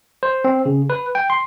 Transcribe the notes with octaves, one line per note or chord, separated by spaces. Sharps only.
C5
C4
C#3
B4
G5
C6